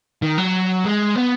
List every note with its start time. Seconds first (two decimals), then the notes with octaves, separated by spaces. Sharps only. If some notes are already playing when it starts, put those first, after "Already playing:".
0.22 D#3
0.38 F#3
0.85 G#3
1.15 B3